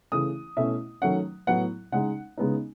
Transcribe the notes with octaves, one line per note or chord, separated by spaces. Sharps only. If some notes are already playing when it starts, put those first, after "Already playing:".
C#3 E3 A3 D#6
B2 A3 C#4 E4 E5
D#3 F#3 A3 C#4 F#5
A2 F#3 B3 F#5
C#3 G#3 D#4 F#5
C#3 G#3 B3 D#4